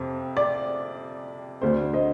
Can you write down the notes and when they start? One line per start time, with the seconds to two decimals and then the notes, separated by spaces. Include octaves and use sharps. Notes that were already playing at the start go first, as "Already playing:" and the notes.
Already playing: F2 C3
0.37 D5
1.62 D2 D3 C5
1.94 C5 D#5